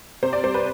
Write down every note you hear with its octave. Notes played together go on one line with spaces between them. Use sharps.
C3 C5
D5
G3 C5
B4